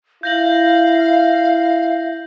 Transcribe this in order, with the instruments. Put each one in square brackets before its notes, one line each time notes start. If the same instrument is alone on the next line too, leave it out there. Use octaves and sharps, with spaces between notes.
[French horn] E4 [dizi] F5 [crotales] G6 A#6 F#7